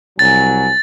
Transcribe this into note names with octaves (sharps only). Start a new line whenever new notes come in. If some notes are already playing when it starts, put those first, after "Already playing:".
C2 F#3 G#5 A6